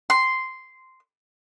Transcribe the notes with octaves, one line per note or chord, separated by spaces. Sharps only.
C6